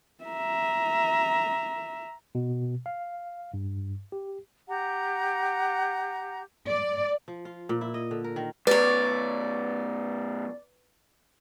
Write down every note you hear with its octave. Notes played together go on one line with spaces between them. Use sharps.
E5 A#5
B2
F5
G2
G4
G4 F#5 A#5
D5
F3
F4
A#2
E4
D#5
D3
A#4
D#3
F#2 B2 B4 C#5 D5